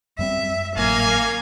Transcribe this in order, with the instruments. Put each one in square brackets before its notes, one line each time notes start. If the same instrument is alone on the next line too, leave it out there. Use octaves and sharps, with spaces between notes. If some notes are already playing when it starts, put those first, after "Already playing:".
[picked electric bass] F#2 G3 C4 [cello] E5
[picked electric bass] G#1 A2 F#3 [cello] A#3 [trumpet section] C#4 F5 G#5